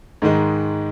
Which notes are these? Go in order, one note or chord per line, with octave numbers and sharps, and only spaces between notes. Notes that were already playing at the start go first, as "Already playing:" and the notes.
G#2 D#3 G#3